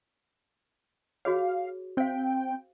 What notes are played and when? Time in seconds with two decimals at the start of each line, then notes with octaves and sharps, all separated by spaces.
1.25 F#4 G#4 C#5 F5
1.97 C4 C5 F5 G5